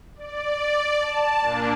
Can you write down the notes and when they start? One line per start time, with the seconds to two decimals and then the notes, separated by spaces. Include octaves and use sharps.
0.15 D5
1.00 A5
1.41 A#2 A#3 D4